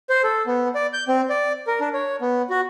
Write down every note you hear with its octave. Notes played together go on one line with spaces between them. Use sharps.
C5
A4
B3
D5
G6
C4
D5
A#4
D4
C#5
B3
F#4